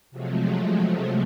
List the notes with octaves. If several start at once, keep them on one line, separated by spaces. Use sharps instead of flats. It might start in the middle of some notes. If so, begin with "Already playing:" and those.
C3 F3 F#3 G#3 A3